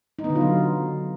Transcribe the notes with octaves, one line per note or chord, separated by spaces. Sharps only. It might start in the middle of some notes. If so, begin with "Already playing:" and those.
D#4
B3
D3
F4
F#3